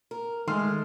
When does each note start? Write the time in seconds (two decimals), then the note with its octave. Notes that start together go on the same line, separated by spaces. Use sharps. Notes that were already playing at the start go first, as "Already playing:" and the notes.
0.11 A#4
0.48 D#3 G#3 A3 C6 F6